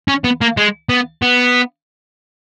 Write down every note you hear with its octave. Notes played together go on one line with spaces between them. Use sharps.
C#4
B3
A#3
G#3
B3
B3